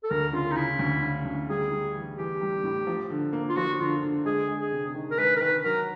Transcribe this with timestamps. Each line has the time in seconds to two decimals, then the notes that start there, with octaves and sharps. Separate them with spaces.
0.04 A4
0.10 D2 A#4
0.33 C#3 F4
0.51 D#4
0.56 C#3 E4
0.79 D2
1.03 C#3
1.25 D2
1.49 G3 G#4
1.71 G3
1.95 E3
2.18 E3 G4
2.41 G3
2.63 A2
2.87 F3
3.10 D3
3.33 A#3
3.49 F4
3.56 F3 F#4
3.79 D3 F4
4.03 D3
4.25 G#3 G#4
4.48 G#3
4.60 G#4
4.72 C3
4.95 D#3
5.11 A#4
5.18 G#3 B4
5.36 A#4
5.41 D#3 B4
5.64 F#3 A#4